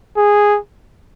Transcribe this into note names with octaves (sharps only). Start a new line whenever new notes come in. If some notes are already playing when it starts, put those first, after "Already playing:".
G#4